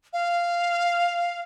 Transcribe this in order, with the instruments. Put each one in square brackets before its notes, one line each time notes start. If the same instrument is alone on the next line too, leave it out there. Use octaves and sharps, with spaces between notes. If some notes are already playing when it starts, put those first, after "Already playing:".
[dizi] F5